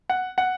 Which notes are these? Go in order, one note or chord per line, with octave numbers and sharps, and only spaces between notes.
F#5
F#5